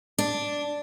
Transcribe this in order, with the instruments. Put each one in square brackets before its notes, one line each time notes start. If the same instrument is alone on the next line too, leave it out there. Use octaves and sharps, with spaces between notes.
[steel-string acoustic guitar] D4